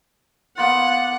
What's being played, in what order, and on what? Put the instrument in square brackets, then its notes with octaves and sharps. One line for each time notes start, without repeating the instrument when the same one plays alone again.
[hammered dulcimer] A#3 B3 F4 [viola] F#5